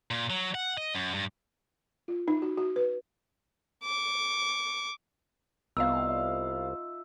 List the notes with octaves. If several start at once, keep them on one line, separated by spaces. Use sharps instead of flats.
A#2
F#3
F#5
D#5
F#2
G2
F4
D#4
F#4
F#4
B4
C#6 D6
C2 B3 D#4 F4 E5 F5 E6